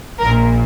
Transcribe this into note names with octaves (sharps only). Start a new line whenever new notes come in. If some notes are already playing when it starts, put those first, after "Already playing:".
A#1 A#2 A#4